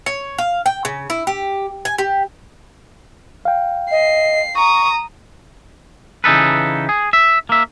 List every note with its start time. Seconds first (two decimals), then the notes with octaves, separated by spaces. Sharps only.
0.06 C#5
0.38 F5
0.66 G5
0.85 C#3
1.10 E4
1.27 G4
1.85 G#5
1.98 G4
3.45 F5 G5
3.91 D#5 C7
4.56 A#5 C#6 D#6
6.24 C#3 E3 D#4 A4 B4
6.89 G#4
7.13 E5
7.49 A#3 E5